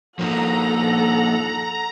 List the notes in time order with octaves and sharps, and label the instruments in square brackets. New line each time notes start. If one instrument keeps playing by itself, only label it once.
[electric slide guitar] F3 A#3 D#4 [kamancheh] A4 F#5 [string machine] A#5